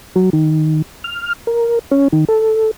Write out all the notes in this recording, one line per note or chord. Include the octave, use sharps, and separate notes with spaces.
F#3
D#3
F6
A#4
C#4
D#3
A4